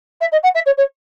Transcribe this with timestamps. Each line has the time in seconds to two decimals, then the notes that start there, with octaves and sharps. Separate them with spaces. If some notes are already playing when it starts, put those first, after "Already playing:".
0.21 E5
0.32 D#5
0.43 F#5
0.55 E5
0.66 C#5
0.77 C#5